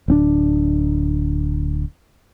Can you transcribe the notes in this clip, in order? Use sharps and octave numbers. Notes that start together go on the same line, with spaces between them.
D1 C4 D4